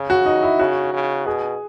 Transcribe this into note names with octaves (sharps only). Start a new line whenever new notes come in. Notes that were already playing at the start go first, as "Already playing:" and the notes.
Already playing: C#3
F#4
D#4
E4
C#3 F#4
C#3
B2 G#4